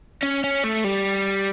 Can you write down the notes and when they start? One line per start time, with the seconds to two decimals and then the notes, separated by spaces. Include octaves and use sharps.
0.23 C#4
0.44 C#4
0.64 A3
0.84 G3